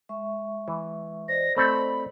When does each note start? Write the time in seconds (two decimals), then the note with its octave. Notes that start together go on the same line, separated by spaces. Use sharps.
0.09 G#3 E5 C#6
0.68 E3
1.28 C5 D5 D#5 A#6
1.56 A3 C4 A4 B5